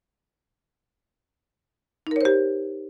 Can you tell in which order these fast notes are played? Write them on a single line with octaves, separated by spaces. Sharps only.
D#4 A#4 C#5 C5 G4